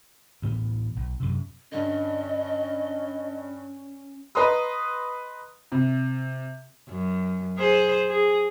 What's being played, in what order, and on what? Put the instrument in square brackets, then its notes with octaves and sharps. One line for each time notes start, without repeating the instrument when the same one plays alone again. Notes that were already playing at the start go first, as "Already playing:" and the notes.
[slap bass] D2 A2 E3 B3
B1
F#2 C3
[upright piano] G2 D3 [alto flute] C#4 [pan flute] D#5
[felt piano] B4 D#5 A#5 C6 D#6
C3
[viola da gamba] F#2
G#4 C5
G#4